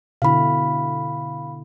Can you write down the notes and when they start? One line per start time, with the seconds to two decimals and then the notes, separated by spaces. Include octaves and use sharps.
0.22 B2 D3 E4 F5 B5